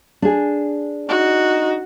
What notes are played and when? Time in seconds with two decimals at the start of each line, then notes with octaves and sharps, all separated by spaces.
0.22 D4 G#4
1.09 D#4 F#4